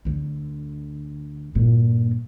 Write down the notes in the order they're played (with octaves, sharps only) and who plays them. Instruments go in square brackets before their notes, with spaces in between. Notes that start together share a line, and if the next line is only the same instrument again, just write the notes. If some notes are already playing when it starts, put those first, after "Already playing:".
[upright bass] D2 D3
G2 A#2